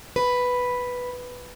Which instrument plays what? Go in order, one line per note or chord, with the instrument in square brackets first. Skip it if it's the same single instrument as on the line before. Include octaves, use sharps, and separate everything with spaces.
[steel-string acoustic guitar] B4